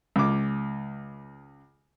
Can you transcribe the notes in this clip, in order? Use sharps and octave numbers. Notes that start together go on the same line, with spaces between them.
C#2 D6